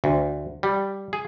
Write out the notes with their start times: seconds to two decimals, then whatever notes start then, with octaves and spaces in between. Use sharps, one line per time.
0.04 D2
0.63 G3
1.13 G#4